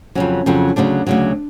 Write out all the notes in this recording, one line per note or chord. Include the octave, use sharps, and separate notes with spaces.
F2 C#3 F#3 C#4
F2 C#3 F#3
D2 C#3 F#3 D4
D2 C#3 F#3